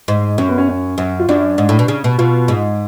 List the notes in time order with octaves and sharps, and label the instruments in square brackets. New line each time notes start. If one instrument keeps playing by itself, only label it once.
[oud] G#2
[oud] F#2 [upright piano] C#4
[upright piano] B3
C#4
C#4
[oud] F#2
[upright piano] F4
[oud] F#2 [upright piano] D4
[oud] G#2
A2
B2
C#3
B2
[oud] B2 [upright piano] F4
[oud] G#2